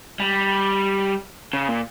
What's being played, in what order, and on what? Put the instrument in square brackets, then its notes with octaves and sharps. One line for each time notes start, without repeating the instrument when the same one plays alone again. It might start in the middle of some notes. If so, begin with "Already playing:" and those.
[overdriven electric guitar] G3
C#3
A#2